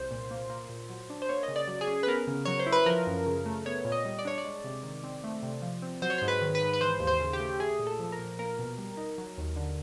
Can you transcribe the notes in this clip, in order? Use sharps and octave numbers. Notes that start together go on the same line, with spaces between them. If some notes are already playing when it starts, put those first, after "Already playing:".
Already playing: C2 C5
A#2
A#3
A#3
A#2
F#3
D4
C5
A#3 C#5
D#5
C#3
D5
F#3
G#4
C#4
B4
B3 A#4
C#3
F#3 C#5
C5
E4
B4
F3 A#4
F#2
C#3
A3
B3 C#5
A#2
D#5
G3
D5
D4 C#5
D5
G#3
C3
D#3
C4
A3
C3
F3
C4
F#3 C5
C#5
G#2 C5
B4
D#3
B4
G#2
B4
E3 C5
D#2
C5
C#3
G4
A3
A3 G#4
A#2
A4
F3
A#4
A#2
A#3 A#4
B2
G3
D#4
F#3
D#2
D3